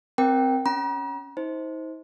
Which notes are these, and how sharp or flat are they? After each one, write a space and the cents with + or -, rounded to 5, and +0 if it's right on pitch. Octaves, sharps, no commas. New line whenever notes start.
C4 +0 A#4 +20 G5 +0
C#4 +0 A#5 +45
D#4 +45 C5 +0